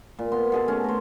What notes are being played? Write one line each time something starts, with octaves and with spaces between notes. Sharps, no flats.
A#2
B3 C6
B2 G#4 A4
A3 C#4
A#4 C5